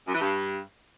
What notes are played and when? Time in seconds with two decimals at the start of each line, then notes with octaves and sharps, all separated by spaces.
0.07 F#2
0.14 E3
0.20 G2